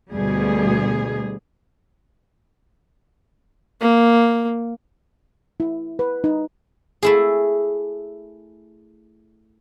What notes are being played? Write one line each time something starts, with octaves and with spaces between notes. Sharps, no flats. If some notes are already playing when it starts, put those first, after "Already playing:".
D2 B2 G3 G#4
A#3
E4
B4
D#4
A3 E4 G#4